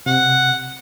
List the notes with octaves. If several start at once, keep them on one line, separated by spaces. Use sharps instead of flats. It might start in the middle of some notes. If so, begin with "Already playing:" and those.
C3 F#5